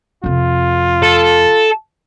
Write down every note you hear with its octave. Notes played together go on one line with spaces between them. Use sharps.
F2 C3 F4
A4